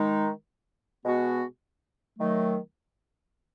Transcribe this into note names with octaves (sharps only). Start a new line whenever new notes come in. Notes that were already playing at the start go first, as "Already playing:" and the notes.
Already playing: D#3 G#3 D#4
B2 G#3 B3 F#4
D#3 F#3 A3